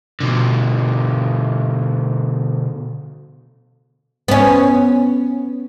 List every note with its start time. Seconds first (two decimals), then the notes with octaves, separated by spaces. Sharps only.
0.20 B2 D3
4.28 B3 C#4